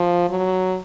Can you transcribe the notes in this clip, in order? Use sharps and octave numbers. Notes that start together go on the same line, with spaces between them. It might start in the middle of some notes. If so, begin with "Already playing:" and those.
Already playing: F3
F#3